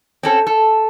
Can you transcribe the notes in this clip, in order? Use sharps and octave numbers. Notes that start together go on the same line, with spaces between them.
C4 C#4 A4
A4